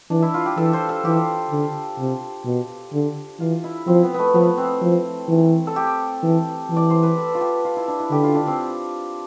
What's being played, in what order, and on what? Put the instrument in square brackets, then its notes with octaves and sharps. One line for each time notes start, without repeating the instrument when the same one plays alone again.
[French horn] E3 [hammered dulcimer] D4
[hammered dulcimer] E4
F4
G4
[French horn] E3 [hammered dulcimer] A4
[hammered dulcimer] C5
A4
[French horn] E3 [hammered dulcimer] G4
[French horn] D3
C3
B2
D3
[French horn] E3 [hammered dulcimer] F4
[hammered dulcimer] E4
[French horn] F3 [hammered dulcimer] C4
[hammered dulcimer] B3
A3 B3
[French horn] F3 [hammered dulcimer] B3
[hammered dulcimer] C4
[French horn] F3
E3
[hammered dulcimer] A4
G4
[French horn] E3
E3
[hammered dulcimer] D5
C5
B4
A4
F4
G4
F4
E4
D4
E4
[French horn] D3 [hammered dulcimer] G4
[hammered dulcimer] F4
D4
C4